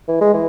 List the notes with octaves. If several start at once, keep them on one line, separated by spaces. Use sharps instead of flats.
E3
G#3
E3